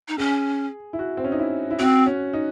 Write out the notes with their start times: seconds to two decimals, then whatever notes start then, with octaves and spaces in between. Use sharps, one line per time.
0.08 D#4
0.18 C#4 G#4
0.93 E4
0.99 F#4
1.17 C4
1.24 C#4
1.32 D#4
1.39 E4
1.71 E4
1.79 C4 F#4
2.06 C#4
2.33 D#4